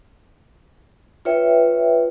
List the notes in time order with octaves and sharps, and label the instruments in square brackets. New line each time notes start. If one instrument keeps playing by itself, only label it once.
[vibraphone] F4 B4 C#5 E5 G5